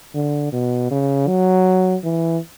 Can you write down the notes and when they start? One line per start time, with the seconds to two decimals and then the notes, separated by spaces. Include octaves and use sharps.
0.15 D3
0.53 B2
0.91 C#3
1.28 F#3
2.04 E3